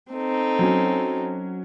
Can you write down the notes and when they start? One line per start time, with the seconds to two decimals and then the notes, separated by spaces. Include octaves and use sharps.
0.12 C4 D#4 A4
0.59 F#3 C#4